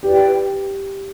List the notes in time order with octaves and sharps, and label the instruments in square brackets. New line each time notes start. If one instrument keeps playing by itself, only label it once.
[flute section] E4 B4 D5 G5 [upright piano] G4